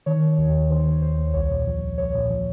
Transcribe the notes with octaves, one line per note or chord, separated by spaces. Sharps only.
D#3 C#5
D#3
D#2
D#2
D#3 C5
D#3
D#2 C5
D#2
C2 C#5
A#2
F3
C2
C2 C#5
A#2
F3